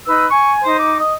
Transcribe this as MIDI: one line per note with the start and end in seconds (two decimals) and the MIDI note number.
0.05 0.26 63
0.05 0.26 71
0.05 0.26 88
0.31 0.61 80
0.31 0.53 85
0.64 0.97 63
0.64 0.78 72
0.79 0.95 86
0.99 1.14 75